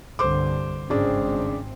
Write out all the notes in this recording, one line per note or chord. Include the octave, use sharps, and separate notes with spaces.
C2 G2 D3 C5 D6
G#1 G2 C#3 C4 D4